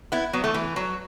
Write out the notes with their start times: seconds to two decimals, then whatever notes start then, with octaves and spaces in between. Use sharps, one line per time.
0.12 B3 E4
0.33 F#3 B3
0.44 E3 A3
0.54 E3
0.76 F#3